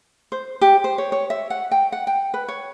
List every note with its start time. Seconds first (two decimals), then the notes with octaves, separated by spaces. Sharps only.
0.32 C5
0.61 G4
0.84 C5
0.98 C#5
1.12 C#5
1.30 E5
1.50 F#5
1.71 G5
1.92 F#5
2.07 G5
2.34 B4
2.48 C#5